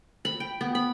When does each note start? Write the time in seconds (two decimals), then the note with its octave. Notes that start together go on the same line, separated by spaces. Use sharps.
0.25 B5
0.40 G5
0.61 B3
0.75 B5